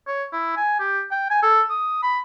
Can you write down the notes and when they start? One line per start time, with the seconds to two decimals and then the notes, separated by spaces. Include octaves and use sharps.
0.07 C#5
0.33 E4
0.57 G#5
0.80 G4
1.11 G5
1.31 G#5
1.43 A4
1.70 D#6
2.03 B5